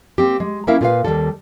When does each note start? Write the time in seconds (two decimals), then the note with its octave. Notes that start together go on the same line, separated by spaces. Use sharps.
0.18 A#3 C4 G4
0.40 G#3
0.67 A#3 C#4 E4 A#4 E5 F5
0.81 A#2 F4 G#4 A#4 B4 F5
1.05 D#2 A#2 D#3 G3 A4